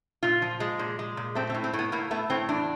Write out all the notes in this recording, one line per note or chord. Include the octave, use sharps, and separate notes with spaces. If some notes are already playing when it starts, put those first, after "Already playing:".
A#2 F4
F3
G#3
A#2
G#3
A#2
A3 C4
C4
A2
C4
A2
B3
A2 A#3
A3 B3
A2 C4
E2 D4